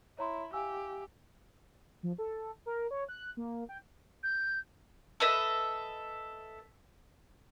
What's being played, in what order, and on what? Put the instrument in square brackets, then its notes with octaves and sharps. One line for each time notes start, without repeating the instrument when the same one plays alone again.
[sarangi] E4 [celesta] C#5 A#5 C6
[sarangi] G4 [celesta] F5 G#5 E6
[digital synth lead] F3
A4
A#4
C#5
F#6
A#3
G5
[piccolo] G6
[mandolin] A4 B4 D#5 E5